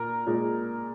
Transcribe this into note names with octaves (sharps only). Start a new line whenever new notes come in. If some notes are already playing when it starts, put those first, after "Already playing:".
Already playing: A#2 A#4
A#2 G#3